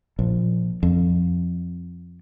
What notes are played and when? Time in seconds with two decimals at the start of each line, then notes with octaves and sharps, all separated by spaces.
0.19 A#1
0.83 F2